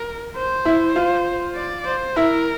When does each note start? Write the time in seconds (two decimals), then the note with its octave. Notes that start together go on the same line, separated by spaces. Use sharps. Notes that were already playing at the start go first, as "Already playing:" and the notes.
Already playing: A#4
0.36 C5
0.65 E4 E5
0.96 F4 F5
1.56 D5
1.86 C5
2.16 E4 A#4 E5